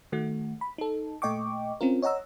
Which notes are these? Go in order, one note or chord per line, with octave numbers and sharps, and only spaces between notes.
D#3 A3 F#4
B5
D#4 A4
A#2 A3 D#5 G5 C#6 D6
C4 C#4 F4 A#4
C#5 D#5 F#5 A#5 E6